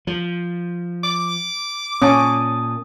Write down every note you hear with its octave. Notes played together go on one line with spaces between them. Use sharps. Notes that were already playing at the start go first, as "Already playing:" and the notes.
F3
D6
A#2 C#4 A5 D#6